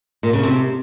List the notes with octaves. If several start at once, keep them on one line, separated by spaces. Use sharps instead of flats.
A#2
C#3
C3